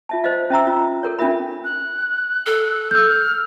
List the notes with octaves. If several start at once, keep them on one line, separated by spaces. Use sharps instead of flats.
F4 E5 A5
C5 C#5 D#5 F5
C#4 E5 A#5 E6
F4
A4 A#4 C#5
C#4 D4 F4 A#4 E5 B5
F#6
A4
E6 F6 G6